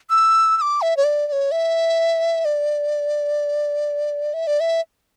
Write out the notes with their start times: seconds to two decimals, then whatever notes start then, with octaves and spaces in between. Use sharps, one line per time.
0.10 E6
0.57 E6
0.61 D6
0.82 E5
0.97 C#5
1.04 D5
1.27 D5
1.32 C#5
1.52 E5
2.45 D5
4.34 E5
4.47 D5
4.60 E5